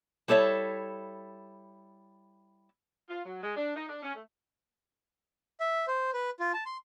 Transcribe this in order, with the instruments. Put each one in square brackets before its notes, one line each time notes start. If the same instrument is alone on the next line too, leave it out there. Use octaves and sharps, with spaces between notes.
[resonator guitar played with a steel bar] G3 E4 A4 C#5 E5
[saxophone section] F4
F#3
G#3
D4
D#4
D4
C#4
A3
[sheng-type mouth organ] E5
C5
B4
F4
A5
C6